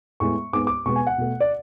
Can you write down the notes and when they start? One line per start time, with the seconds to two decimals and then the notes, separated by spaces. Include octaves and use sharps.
0.20 A2 G#3 B3 C#6
0.53 G#2 G#3 B3 D6
0.67 D6
0.86 B2 G#3 B3 C#6
0.96 G#5
1.07 F#5
1.18 B2 A3
1.40 D5